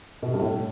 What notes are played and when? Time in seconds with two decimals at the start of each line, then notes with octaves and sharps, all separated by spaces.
0.23 B2
0.28 C3
0.34 G2
0.40 A2